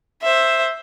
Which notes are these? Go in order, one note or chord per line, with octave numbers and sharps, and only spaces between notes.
C5 E5